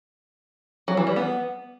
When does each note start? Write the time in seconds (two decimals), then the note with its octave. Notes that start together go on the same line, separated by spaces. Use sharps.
0.88 F#3
0.97 E3
1.07 G3
1.16 B3